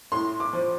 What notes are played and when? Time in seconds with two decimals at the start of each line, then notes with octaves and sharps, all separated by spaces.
0.12 A2 C6
0.40 D6
0.53 F3